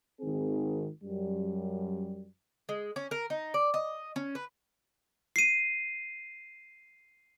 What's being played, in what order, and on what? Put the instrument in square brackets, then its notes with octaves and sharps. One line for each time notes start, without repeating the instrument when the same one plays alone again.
[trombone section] G#1 D#3 C4 G#4
F#2 G3
[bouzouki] G#3
C#4
A#4
D#4
D5
D#5
C#4
B4
[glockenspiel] C7 D#7